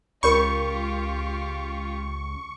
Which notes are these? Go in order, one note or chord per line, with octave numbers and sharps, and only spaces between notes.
C#2 F4 G4 A#4 C#5 B5 C#6